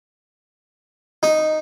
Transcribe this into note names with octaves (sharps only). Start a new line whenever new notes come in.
D#4